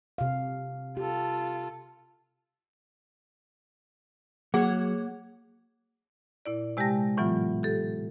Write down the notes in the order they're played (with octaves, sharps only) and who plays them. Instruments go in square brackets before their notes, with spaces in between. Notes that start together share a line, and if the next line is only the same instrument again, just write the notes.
[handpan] C3 F5
[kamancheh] F4 A4 [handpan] G4
[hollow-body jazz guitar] F#3 [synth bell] A#3 D6 [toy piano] G#4 [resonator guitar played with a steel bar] C#5 F#5
[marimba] A#2 E4 D5
C3 G#3 G4 G5 A5 A#6
A2 E3 F#3 B3 F4
G4 A4